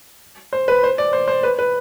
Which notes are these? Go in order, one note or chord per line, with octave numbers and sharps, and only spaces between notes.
C5
B4
C5
D5
C5
C5
B4
B4